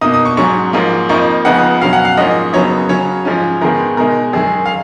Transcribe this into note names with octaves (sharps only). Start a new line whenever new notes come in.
B2 A#3 D#4 D#6
D#6
C#6
G#2 F#3 C#4 C#6
G#2 F3 A#3
F2 F3 A#3 D#4 C#6
C#2 C#3 F3 B3 D#4 F#5
B2 F#3 C#4 F5
F#5
F5
G#2 F3 A#3 C#4 D#5
F#2 C#3 F#3 B3 D#4 C#5
C#3 F#3 C#4 C#5
G#2 F3 G#3 C#4
G#2 D#3 G#3 B3 D#4 A#4
B2 G#3 D#4 A#4
F#2 D#3 G#3 G#4
F5